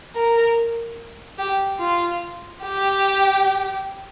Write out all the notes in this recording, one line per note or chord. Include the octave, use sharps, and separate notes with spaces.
A#4
G4
F4
G4